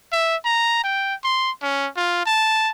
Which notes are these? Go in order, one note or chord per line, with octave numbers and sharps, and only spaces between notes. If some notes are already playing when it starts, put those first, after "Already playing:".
E5
A#5
G5
C6
C#4
F4
A5